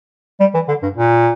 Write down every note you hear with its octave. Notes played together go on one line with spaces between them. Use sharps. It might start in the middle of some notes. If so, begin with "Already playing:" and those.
G3
E3
D3
G2
A#2